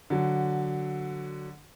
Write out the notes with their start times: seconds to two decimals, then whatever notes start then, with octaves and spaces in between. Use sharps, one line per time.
0.10 D3 F#3